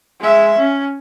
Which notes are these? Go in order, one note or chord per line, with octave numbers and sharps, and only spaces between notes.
G#3 E5
C#4